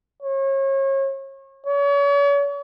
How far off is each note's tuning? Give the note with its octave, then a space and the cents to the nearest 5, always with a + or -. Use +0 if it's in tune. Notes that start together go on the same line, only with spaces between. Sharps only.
C#5 -35
C#5 +40